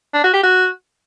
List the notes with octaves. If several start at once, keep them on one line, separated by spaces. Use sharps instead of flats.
D4
F#4
G4
F#4